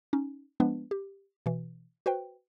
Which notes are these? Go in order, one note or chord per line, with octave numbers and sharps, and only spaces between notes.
C#4 D#4
F3 G#3 B3 D4 B4
G4
B2 E3
F#4 B4 C5 G5